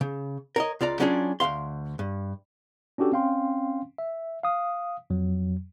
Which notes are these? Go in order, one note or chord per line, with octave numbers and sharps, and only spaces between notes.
C#3
A#4 C#5 D#5
C#2 F4 D5 A#5
F#3 C#4 D4 F4 G#4
D2 F#3 F5 C6
G2
C#4 D4 F#4 G4 A4
C4 C#4 F5 G5 C6
E5
F5 D#6
F2 F#3